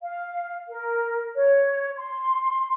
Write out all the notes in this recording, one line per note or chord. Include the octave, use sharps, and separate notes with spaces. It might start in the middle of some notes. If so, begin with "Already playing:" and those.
F5
A#4
C#5
C6